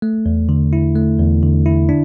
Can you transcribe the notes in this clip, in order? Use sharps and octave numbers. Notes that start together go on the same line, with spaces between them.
A3
E2
D3
E4
A3
E2
D3
E4
D4